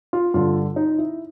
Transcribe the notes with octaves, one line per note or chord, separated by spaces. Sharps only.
F4
G2 D3 F4
D#4
E4